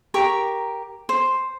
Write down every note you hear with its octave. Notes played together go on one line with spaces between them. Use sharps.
G4 A#4 A#5 C#6
C5